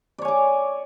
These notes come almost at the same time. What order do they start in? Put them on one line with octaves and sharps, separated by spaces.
D5 C#5 G#5 D6